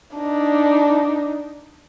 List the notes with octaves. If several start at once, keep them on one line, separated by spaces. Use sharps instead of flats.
D4 D#4